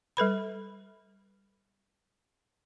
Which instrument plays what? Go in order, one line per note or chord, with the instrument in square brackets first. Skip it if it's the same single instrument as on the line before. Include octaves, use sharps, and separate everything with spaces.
[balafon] G3 A4 B4 B5